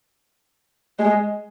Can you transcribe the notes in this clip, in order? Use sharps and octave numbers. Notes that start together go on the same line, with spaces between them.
G#3